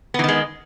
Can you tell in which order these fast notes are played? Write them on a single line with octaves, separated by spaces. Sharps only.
B3 E3 D#3 G#3